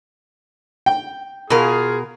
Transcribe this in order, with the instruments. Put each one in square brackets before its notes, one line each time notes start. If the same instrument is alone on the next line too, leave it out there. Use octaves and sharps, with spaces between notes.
[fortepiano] G5
[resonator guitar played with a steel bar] B2 A#4 [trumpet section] F4 G#4